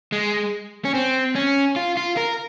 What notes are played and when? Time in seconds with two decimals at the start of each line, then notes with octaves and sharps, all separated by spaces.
0.12 G#3
0.85 C#4
0.94 C4
1.35 C#4
1.76 F4
1.97 F4
2.17 A#4